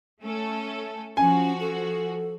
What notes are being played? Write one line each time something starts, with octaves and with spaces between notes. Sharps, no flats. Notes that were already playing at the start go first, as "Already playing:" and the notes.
A3 C#4 A4
F3 C#4 F#4 G#5
A4